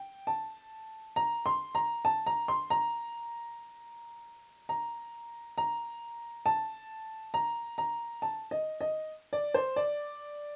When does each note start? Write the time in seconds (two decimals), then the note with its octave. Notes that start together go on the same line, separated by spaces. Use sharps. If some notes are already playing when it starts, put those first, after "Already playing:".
Already playing: G5
0.27 A5
1.16 A#5
1.46 C6
1.75 A#5
2.05 A5
2.26 A#5
2.48 C6
2.70 A#5
4.69 A#5
5.58 A#5
6.46 A5
7.34 A#5
7.78 A#5
8.22 A5
8.51 D#5
8.81 D#5
9.33 D5
9.54 C5
9.76 D5